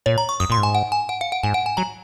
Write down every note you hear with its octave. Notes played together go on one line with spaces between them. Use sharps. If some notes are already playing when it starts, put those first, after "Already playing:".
A#2 C#5
A#5
C#6
F#2 D#6
A#2 C6
G#2
G#5
F#5
G#5
F#5
F5
F#5
G#2 G#5
F#5
G#5
F#3 A#5